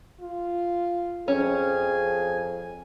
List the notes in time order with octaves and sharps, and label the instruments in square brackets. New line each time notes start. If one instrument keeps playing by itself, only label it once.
[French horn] F4
[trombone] F2 [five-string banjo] C#4 [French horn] G#4 [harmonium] G#5